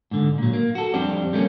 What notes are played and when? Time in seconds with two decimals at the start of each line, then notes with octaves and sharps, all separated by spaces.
0.11 G#2 D3
0.38 A#2 F#3
0.53 A#3
0.75 F#4 A4
0.94 F2 G3 C4 D4 G4
1.33 G3 A3 A#3 C#4